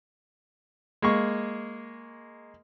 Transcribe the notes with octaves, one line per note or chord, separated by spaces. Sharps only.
G#3 A#3 C#6